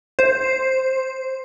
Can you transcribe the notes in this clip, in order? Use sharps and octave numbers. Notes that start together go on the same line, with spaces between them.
C5